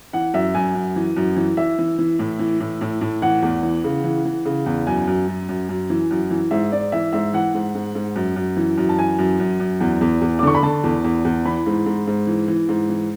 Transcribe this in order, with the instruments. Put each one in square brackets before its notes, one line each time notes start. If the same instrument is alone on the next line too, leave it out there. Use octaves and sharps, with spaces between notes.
[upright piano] E3 F#5
F#2 E5
F#2 G#5
F#2
E3
F#2
E3
E3 E5
E3
E3
A2
E3
A2
A2
A2
E3 F#5
E2
E3
C#3
E3
E3
C#3
E2
F#2 G#5
F#2
F#2
F#2
F#2
E3
F#2
E3
G#2 E5
G#2 D5
E3 E5
G#2 E5
E3 F#5
G#2
G#2
G#2
F#2
F#2
E3
F#2
A5
E3 G#5
F#2
F#2
F#2
E2
E2
E2
D6
D3 C#6
B5
D3 A5
E2
E2
E2
E3 B5
G#2
G#2
G#2
E3
E3
G#2
E3